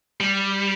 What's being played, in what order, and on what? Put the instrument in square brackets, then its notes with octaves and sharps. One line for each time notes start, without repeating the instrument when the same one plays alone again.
[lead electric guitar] G3